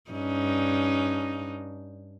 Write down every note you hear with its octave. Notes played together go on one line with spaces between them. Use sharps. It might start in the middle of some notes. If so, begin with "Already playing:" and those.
G2 C#4 D#4